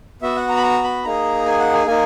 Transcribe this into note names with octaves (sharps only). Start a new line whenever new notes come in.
B3 F#4 E5
F#5
A#5
B5
A#5
B5
A#3 D#4 G#4 A#5
G#5
F#5
G#5
A#3 D#4 G#5